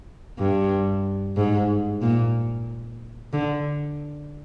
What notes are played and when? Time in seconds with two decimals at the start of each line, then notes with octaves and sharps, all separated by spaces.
0.39 G2
1.37 G#2
2.02 A#2
3.33 D3